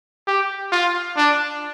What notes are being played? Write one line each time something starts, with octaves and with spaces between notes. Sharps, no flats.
G4
F4
D4